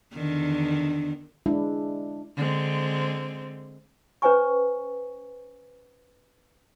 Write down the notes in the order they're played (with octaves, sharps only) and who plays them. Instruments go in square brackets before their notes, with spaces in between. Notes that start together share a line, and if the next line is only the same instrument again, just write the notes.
[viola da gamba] E2 D3 D#3
[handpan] G#3 D4 E4
[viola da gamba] D3 G#3 C4
[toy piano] C#4 B4 C5 G5 G#5 C#6